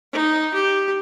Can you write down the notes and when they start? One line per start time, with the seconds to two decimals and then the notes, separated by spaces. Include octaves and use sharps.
0.13 D#4
0.54 G4